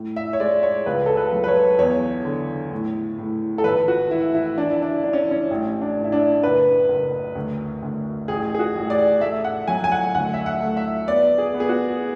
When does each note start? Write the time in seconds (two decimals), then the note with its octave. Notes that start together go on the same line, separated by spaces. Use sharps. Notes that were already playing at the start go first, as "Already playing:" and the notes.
Already playing: A2
0.16 E5
0.33 C#5
0.40 G#3 D5
0.63 C#5
0.86 C#2 B4
1.06 A4
1.17 B4
1.32 F#3
1.44 B4
1.48 C#5
1.79 E2 C#5
2.25 D3
2.71 A2
3.18 A2
3.58 A4
3.64 G#1 B4
3.88 F#4
4.11 E3 E4
4.35 E4
4.58 E3 D4
4.70 E4
4.82 D4
5.03 E3 D4
5.13 C#4
5.31 C#4
5.51 A1
5.82 D4
5.97 A2
6.04 E4
6.12 D4
6.43 F#1 B4
6.89 F#1
7.35 D2
7.82 D2
8.28 A1 G#4
8.55 G#4
8.59 F#4
8.75 A1
8.90 D5
9.21 A3 E5
9.44 F#5
9.68 F#3 G#5
9.84 G#5
9.92 F#5
10.15 D2 F#5
10.34 E5
10.46 F#5
10.61 A3
10.77 E5
11.07 B3 D5
11.38 G#4
11.54 B3
11.60 G#4
11.69 F#4